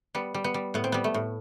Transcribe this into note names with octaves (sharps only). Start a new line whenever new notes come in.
G3 B3
G3
B3
G3
A2 B3
C4
G3 B3
A3
A2